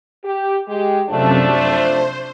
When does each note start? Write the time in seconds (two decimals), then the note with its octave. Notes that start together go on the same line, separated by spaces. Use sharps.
0.25 G4
0.68 G#3 G4
1.10 F#2 C3 F3 A3 D4
1.48 C5